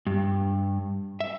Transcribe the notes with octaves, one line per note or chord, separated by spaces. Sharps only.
G2
E5